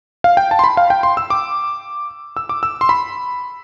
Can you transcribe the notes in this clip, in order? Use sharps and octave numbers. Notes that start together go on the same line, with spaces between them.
F5
G5
A5
C6
B5
F5
G5
C6
E6
D6
E6
D6
E6
C6
B5